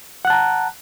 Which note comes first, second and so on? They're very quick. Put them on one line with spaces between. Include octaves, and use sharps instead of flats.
F#5 F#6 A5 A#5